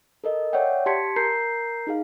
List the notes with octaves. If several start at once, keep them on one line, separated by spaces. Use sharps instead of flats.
A4 A#4 D#5
C#5 D5 E5 F#5 G5
G4 A5 C6 G#6 B6 C#7
A#4 A#5 G6 C7
D#4 G#4 F5